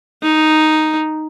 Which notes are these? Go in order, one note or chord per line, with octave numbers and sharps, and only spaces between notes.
D#4